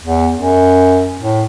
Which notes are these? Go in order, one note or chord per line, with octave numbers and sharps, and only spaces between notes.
E2
F#2
A2